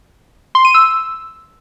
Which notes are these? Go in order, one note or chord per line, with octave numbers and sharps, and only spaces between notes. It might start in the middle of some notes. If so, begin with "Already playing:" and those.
C6
D#7
E6